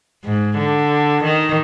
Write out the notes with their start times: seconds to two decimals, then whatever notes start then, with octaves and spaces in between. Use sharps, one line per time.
0.24 G#2
0.58 D3
1.24 D#3